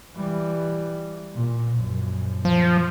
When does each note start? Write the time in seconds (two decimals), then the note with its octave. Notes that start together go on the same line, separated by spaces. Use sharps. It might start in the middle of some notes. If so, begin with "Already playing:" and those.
0.16 E3 G3
1.34 A#2
1.76 A#1 F#2
2.45 F3